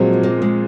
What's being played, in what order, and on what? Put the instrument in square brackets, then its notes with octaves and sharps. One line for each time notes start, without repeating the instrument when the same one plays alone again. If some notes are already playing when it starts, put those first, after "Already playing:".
Already playing: [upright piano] A#2 F3 G#3 C4 [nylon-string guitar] F#3
[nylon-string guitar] A#3
G#3